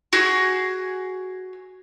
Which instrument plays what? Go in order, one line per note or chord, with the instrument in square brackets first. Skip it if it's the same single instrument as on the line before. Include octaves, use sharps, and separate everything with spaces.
[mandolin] F#4 G#4